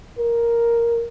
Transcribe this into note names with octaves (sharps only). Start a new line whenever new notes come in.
A#4